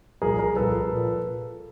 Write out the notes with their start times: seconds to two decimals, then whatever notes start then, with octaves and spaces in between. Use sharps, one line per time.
0.22 C2 A#2 F3 G#4 A#4
0.39 G#4 A#4
0.56 C2 A#2 F3 A4 B4
0.90 A#2 F3